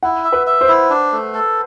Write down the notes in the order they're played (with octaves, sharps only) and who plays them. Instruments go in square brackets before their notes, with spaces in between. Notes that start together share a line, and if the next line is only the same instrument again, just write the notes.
[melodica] E4 [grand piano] F#5
[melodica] E5
[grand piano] B4
[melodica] E5
[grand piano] C5
[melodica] E4
D4
A3
A4